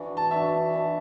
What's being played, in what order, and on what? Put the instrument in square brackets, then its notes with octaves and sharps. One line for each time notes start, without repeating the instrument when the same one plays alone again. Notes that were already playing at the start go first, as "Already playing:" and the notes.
Already playing: [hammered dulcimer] E3 D4 F#4
[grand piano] A5
[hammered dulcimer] E3 D4 F#4 [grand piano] E5
[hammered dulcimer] E3 D4 F#4